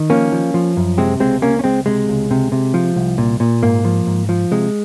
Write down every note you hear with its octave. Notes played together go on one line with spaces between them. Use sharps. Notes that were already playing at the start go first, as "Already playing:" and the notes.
Already playing: D#3
F3 A#3 C#4
F3
F3
F#2
C3 G#3 C4
C#2 G#3 C4
C#2 A#3 C#4
C#4
C#2 G#3 C4
C3 G#3
C#2
C3
C3
F3
C2
A#2
A#2
G#2 A#3
F3
G#2
F3
C3 G#3